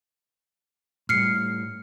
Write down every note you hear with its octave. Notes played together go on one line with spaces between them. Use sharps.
A2 G3 F6 C7 C#7